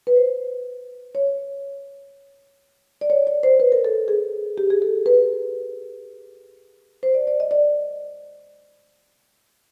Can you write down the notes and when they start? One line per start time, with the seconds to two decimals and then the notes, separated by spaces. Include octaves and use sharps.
0.07 B4
0.16 C5
1.15 C#5
3.01 D5
3.10 C#5
3.27 D5
3.43 C5
3.60 B4
3.72 A#4
3.85 A4
4.08 G#4
4.58 G4
4.70 G#4
4.82 A4
5.06 B4
7.03 C5
7.14 D5
7.27 D5
7.40 D#5
7.51 D5